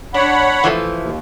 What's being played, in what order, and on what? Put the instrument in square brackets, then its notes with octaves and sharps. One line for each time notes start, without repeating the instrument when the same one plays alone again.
[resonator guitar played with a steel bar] D4 [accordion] C#5 F#5 B5
[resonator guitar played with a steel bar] E3 F3 A3
[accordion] D#2